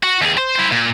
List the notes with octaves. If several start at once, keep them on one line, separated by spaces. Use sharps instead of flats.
F#4
D#2 G#4
C5
E4 C5
A#2